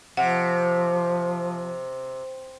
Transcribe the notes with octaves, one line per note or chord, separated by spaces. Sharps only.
C3 F3 F#5